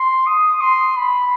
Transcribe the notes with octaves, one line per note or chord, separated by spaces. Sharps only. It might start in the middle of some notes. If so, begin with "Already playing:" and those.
Already playing: C6
D#6
C6
B5